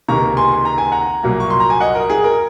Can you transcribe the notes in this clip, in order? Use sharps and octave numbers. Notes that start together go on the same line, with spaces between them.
C#2 C3 D#3 A#3 A#5 C#6
G#5 C6
C6
A#5
G#5
F#5 A#5
C2 A#2 F#3 A#3
C#6
C6
A#5
G#5
D#5 F#5
A#4
G#4
A#4